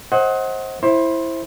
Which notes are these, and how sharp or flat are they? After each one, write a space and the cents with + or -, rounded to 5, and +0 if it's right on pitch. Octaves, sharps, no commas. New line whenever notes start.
C5 +25 D#5 +30 F#5 +10
E4 +0 C5 +20